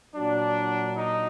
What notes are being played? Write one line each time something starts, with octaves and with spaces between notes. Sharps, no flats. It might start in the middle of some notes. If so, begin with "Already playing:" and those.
A#2 F#3 D4
D#4